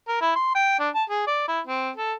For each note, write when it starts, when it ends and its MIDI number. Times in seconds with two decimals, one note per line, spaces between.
0.08 0.18 70
0.21 0.33 64
0.36 0.54 84
0.55 0.76 79
0.80 0.89 62
0.95 1.04 81
1.10 1.27 68
1.27 1.45 74
1.48 1.60 64
1.67 1.90 60
1.96 2.13 69